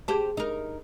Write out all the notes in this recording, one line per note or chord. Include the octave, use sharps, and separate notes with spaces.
G4 G#4 C5 A5
D#4 A#4